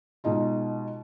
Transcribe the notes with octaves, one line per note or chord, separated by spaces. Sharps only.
B2 G#3 D#4 F4